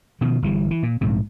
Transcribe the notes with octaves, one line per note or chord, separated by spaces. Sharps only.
B2 D#3 F3
G1 E3 G3
E3
A#2
A#1 G#2 C3